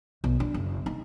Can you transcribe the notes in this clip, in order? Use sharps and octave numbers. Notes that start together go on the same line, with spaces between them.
B1
D4
F#1
D#4